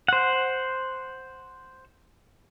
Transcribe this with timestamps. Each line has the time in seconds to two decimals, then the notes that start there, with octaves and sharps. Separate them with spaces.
0.08 C5 F#5